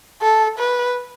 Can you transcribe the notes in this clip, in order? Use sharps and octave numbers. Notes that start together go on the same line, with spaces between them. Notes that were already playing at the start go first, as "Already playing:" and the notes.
A4
B4